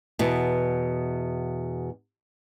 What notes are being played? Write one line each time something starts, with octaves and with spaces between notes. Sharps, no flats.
E2 B2